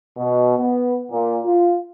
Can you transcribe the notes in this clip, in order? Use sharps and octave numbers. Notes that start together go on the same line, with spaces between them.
B2
B3
A#2
F4